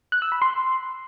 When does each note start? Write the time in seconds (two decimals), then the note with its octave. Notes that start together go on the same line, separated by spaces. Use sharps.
0.12 F#6
0.22 E6
0.32 B5
0.42 C6